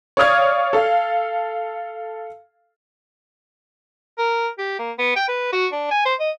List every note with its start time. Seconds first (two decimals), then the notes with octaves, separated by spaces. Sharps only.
0.17 C#5 D5 F5 D#6 F6 G#6
0.73 A4 F5
4.18 A#4
4.58 G4
4.79 A#3
4.99 B3
5.16 G5
5.28 B4
5.52 F#4
5.72 D4
5.91 G#5
6.05 C5
6.20 D#5